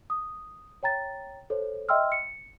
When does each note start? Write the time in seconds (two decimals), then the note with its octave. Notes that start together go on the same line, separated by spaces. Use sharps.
0.10 D#6
0.83 C#5 G5 A#5 A6
1.50 A4 C5 C#5
1.89 D#5 E5 G5 C6 E6 F6
2.12 C#7